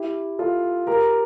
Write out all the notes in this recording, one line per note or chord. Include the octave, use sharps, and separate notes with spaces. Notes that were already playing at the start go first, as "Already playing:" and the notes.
Already playing: E4 G4
F4 A4
G4 A#4